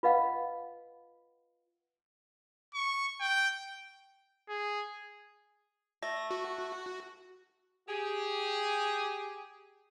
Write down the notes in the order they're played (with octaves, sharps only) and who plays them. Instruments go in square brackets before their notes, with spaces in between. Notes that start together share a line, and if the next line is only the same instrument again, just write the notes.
[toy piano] F4 B4 D#5 F5 F#5
[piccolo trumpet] C#6
G5
G#4
[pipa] A3 [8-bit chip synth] A#6
[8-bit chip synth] F#4
[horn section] G4 G#4